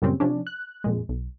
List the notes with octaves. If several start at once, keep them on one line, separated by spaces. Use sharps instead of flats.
F#2 A#2 C#3 G3 C4 C#4
C3 F3 C#4 D4
F#6
F2 A#2 G#3
B1